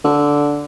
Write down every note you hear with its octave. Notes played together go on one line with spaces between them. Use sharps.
D3